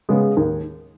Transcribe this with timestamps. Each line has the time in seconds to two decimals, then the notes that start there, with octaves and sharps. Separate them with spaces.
0.09 C#3 G#3 B3
0.37 D#2